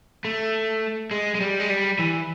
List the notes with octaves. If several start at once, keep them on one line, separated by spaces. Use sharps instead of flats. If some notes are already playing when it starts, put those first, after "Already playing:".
A3
G#3
G#3
G3
G#3
G3
E3